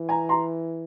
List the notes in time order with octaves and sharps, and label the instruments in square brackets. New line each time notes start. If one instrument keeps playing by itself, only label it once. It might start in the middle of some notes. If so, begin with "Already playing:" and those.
Already playing: [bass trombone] E3
[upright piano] G#5 A#5
A#5 C6